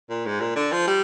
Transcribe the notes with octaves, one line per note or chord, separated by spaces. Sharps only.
A#2
G#2
A#2
D3
F3
G3